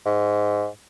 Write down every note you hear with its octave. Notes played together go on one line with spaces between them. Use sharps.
G#2